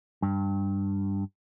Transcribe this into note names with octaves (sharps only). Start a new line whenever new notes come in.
G2